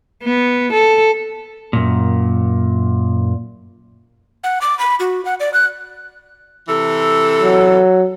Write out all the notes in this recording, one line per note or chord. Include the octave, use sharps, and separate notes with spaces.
B3
A4
F#2 A#2
F#5
D6
B5
F#4
F#5
D5
F#6
C3 E3 A4
F#3